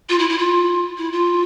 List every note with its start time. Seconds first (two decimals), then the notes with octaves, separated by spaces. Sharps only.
0.09 F4
0.19 E4
0.29 E4
0.39 F4
0.98 E4
1.13 F4